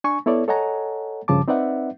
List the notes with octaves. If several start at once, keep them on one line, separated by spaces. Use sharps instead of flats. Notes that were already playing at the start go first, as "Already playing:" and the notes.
D4 G#5 C#6
B3 E4 A4 C#5 D5
A4 C#5 D#5 F#5 G#5 A#5
G2 C#3 F3 A5 D6
C4 D#4 B4 D5 E5 F#5